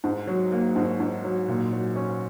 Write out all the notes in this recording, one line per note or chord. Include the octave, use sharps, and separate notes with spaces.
G#2
F#3
A#3
G#2
G#2
F#3
A#2
F#3
C#4